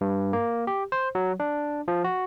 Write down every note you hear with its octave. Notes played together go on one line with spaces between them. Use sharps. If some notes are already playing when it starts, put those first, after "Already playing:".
G2
A#3
G4
C5
F#3
D4
F3
F#4